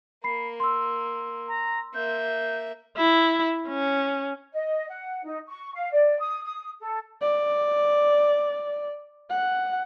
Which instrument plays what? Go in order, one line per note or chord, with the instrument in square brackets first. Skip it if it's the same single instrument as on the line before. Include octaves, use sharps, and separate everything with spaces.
[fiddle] A#3 [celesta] B5 C7
[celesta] C6 E6
[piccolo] A#5
[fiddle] A#3 E5 [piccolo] G6
[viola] E4
C#4
[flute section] D#5
F#5
D#4
C#6
F5
D5
D#6
D#6
A4
[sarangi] D5
F#5